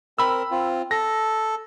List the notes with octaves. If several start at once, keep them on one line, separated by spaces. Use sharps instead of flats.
C4 A#4 B5 E6
C4 F4
A4 A#6